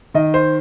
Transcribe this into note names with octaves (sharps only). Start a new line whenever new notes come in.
D#3 D#5
C5